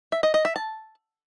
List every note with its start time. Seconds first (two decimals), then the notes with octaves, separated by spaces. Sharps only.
0.12 E5
0.23 D#5
0.34 D#5
0.45 E5
0.56 A5